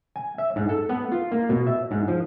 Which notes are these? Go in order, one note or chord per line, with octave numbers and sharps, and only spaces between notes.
G#5
E5
G#2
A4
B3
F4
A#3
B2
E5
G#2
F3